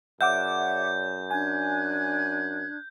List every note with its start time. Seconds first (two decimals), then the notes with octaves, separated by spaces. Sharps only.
0.21 F#2 G#4 C#5 D5 E5 F#5 D6 G6
1.31 D4 G#5 F#6 G#6